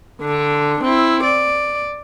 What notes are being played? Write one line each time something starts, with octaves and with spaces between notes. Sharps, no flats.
D3 D4
C4 E4
D5